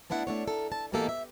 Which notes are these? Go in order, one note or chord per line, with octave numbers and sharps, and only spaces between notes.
A3 B3 D4 E4 F#5
A3 D4 C#5
A4 A#4
A5
G#2 B2 E3 A#3 G4 A4
E5